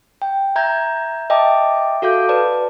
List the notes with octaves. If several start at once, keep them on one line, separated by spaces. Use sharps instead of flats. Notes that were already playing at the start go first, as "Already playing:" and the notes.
G5
E5 A#5 G6 G#6
D#5 E5 G5 A5 D6
F#4 A4 F5 D6 G6
B4 D5 A5